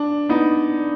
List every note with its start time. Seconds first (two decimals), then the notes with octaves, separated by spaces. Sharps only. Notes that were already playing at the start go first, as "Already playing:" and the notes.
Already playing: D4
0.29 B3 D#4